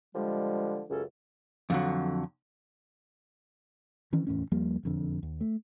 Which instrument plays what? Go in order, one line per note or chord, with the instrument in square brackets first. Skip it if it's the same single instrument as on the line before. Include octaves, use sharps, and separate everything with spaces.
[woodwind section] D3 F3 G3 G#3
C#2 F#2 C#3 C#4 A4
[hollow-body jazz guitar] F2 D3 F#3
[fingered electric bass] D#3 E3 C#4
D1 E2 A2 C#4
D#2 F3 G3 A#3
E1 F2 D3
D#2
A3